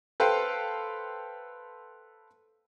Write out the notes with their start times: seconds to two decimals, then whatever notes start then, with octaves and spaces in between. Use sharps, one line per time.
0.20 A4 B4 C5 F5 G5